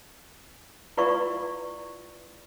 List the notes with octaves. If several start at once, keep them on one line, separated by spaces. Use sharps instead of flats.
E4 F4 B4 D5 F5 C#6